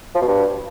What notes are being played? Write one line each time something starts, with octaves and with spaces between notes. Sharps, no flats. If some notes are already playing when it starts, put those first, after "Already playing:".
F3
B2
G2